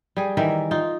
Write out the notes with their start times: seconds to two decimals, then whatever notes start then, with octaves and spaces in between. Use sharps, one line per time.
0.17 G3 G#4
0.37 D#3 E3 A#4 E5
0.71 D#4 F4